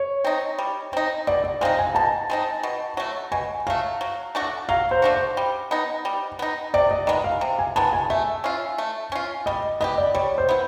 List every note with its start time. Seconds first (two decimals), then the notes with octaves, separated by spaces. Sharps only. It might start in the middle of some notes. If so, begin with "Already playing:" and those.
Already playing: C#5
0.24 C4 D#4
0.59 G3
0.93 C4 D#4
1.27 B2 D5
1.44 D#5
1.61 G#3 C4 D#4 F5
1.79 G#5
1.95 B2 A5
2.30 G#3 C4 D#4
2.63 B2
2.97 F#3 A3
3.32 B2 G#5
3.67 F#3 A3 F5
4.01 F#3
4.35 A3 D4 F#4
4.69 F#3 F5
4.91 C5
5.02 A3 D4 F#4
5.15 C5
5.37 G3
5.71 B3 D#4
6.05 G3
6.39 B3 D#4
6.74 C3 D5
6.91 D#5
7.07 D#3 G#3 B3 D#5
7.24 F5
7.41 C3
7.59 G#5
7.76 D#3 G#3 B3 A5
7.93 G#5
8.10 A3 E5
8.44 C#4 F4
8.78 A3
9.12 C#4 F4
9.46 G3 D#5
9.81 B3 E4 G4 D#5
9.98 D5
10.15 G3 C#5
10.38 C5
10.49 B3 E4